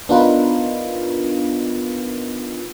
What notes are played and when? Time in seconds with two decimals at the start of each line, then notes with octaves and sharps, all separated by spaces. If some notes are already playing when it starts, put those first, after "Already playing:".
0.09 B3 D4 D#4 F4 A#4 B4